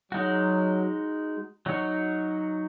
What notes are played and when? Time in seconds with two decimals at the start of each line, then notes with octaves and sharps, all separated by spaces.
0.12 F#3 G#3 D#4 F#4
1.66 F#3 D#4 F#4 C#5